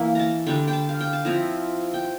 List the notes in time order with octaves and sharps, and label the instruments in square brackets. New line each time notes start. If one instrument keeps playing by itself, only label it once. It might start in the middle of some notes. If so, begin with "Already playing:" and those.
Already playing: [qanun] E3 A#3 E4
A5 A#5
D3 G3 D4 G5
G5
A5
F5
G5
A5
F3 C4 E4 A#5
G5